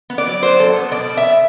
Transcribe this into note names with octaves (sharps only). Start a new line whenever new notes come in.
B3
D5
F#3
F#3 C5
F#2 A4
B3
B2 D5
B2
E5